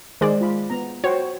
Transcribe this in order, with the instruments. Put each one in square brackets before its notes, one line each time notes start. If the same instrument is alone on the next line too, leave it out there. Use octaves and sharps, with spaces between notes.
[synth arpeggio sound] D#3 G#3 D5 [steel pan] G#4 C5
[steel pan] F4 B5
B3 A#5
[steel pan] F#4 C5 G5 [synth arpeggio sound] C#5